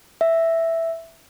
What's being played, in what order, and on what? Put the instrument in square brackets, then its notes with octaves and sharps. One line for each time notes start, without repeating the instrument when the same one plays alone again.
[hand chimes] E5